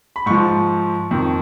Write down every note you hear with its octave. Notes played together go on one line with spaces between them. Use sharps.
B5
G#2 F3 C#6
F2 D#3